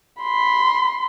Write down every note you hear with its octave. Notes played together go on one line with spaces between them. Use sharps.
B5 C6